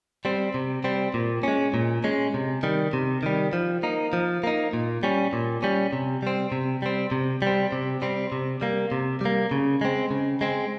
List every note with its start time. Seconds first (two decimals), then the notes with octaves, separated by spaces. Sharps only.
0.25 G3 C4
0.54 C3
0.84 G3 C4
1.14 A#2
1.43 G#3 C#4
1.74 A#2
2.04 G#3 C#4
2.34 C3
2.63 D#3 G3
2.93 C3
3.23 D#3 G3
3.53 F3
3.83 A#3 D#4
4.13 F3
4.44 A#3 D#4
4.73 A#2
5.03 G3 C#4
5.33 A#2
5.62 G3 C#4
5.93 C3
6.23 G3 C4
6.52 C3
6.82 G3 C4
7.12 C3
7.42 G3 C4
7.72 C3
8.02 G3 C4
8.32 C3
8.61 G3 A#3
8.92 C3
9.21 G3 A#3
9.51 C#3
9.81 G#3 C4
10.11 C#3
10.41 G#3 C4